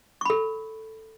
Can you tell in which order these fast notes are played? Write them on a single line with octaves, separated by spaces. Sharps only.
C#6 B5 A4